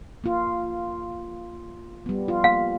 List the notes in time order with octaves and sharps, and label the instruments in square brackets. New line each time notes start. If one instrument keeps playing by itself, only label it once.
[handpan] A#3 F4
G3 B3
F4
[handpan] A#3 [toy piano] F5